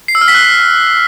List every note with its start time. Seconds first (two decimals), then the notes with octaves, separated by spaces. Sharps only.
0.08 C7
0.15 E6
0.21 F6
0.28 B6
0.35 F#6